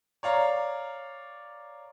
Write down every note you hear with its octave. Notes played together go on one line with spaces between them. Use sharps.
C#5 D5 F5 A#5